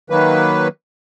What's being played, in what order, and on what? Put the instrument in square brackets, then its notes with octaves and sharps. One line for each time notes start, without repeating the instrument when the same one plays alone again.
[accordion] D#3 F#3 A#3 B4